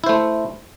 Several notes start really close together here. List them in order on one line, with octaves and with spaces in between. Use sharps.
E4 C5 A3